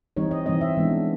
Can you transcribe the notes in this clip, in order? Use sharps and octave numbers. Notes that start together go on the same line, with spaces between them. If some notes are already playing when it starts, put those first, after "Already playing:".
E3 G3 C4 D#4 C#5
D#5
E3 G3 C4 D#4 D#5
E5
E3 G#3 B3 D4